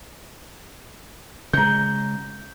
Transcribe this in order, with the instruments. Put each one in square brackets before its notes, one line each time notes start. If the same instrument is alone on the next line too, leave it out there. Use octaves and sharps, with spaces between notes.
[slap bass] C#3 G#3 [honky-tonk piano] A#5 G6